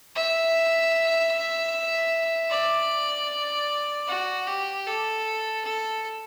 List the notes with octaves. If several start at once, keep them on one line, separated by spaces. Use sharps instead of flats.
E5
D5
F#4
G4
A4
A4